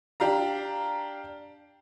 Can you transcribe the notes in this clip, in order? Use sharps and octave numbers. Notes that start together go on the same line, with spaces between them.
D4 G4 F5 A#5